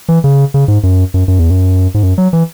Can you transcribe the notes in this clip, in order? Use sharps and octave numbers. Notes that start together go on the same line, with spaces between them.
E3
C#3
C#3
G#2
F#2
F#2
F#2
E2
F#2
G#2
F#2
F#3
E3